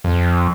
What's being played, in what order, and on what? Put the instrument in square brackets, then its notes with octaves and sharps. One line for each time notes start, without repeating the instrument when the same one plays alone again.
[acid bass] F2